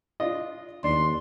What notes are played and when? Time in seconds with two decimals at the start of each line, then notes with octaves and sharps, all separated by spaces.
0.20 D4 F4 D#5
0.84 D#2 D4 C6